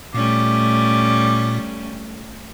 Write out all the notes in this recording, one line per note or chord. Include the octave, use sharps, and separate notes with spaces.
A#2 G3 A3 C#4 D6